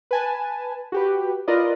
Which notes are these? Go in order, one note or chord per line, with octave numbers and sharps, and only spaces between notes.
B4 G#5 A5
F#4 G4 B4
F4 A#4 B4 D5 D#5